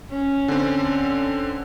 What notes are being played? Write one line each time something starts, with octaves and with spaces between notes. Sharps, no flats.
C#4
D3 C4